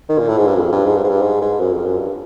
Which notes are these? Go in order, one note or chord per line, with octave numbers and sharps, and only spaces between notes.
D#3
A#2
A2
G#2
G2
F#2
F2
G2
G#2
G2
G#2
G2
G#2
G#2
F#2
F2
F#2
G2